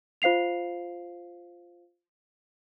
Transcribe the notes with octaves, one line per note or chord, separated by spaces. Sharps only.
F4 C5 F5 C7 F7